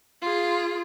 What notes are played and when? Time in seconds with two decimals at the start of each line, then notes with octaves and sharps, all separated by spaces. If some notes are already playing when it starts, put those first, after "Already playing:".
0.22 F4 G#4